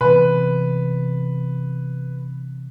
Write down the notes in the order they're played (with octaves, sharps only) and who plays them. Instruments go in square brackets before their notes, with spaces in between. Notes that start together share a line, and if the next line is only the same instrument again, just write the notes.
[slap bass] C3 E3 B3 [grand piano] B4